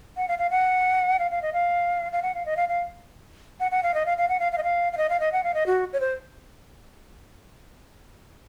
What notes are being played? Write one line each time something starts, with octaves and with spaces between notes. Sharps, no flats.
F#5
F5
F5
F#5
F5
F5
D#5
F5
F5
F#5
F5
D#5
F5
F5
F#5
F#5
F5
D#5
F5
F5
F#5
F5
F5
D#5
F5
F5
D#5
F5
D#5
F#5
F5
D#5
F#4
C#5
C5